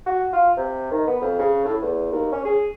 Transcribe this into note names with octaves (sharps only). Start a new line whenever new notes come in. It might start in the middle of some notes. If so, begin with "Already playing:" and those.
F#4
F4
C3
D#3
B3
F2
C#3
A2
E2
D#2
C#4
G#4